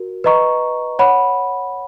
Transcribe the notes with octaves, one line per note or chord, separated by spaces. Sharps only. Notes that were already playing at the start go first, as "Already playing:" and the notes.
Already playing: F#4 A#4
B4 D#5 A#5 C#6
C#5 F#5 B5